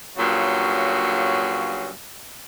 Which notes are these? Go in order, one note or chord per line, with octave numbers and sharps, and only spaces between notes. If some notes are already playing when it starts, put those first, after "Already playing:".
G2 A#2 C#3 F#3